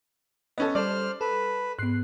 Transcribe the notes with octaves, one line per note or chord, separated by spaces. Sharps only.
B3 C#4 A4 D#5
G3 A4 C5 D5 F6
A4 B4
G#2 B3 F#6 C7